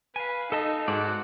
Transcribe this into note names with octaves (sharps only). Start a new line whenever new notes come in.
B4 F5 G#5
D#4 A4 D#5 A5
G#2 F#4 D5 F#5